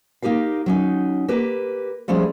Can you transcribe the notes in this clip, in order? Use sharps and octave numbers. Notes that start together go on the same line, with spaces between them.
A#3 D#4 G4 A#4 F5
F#3 C#4 D#4
A#3 G4 B4
F3 G3 A3 C#4 G#4 C5